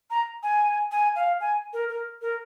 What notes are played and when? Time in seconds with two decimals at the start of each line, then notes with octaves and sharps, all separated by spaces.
0.10 A#5
0.43 G#5
0.92 G#5
1.16 F5
1.41 G#5
1.73 A#4
1.89 A#4
2.22 A#4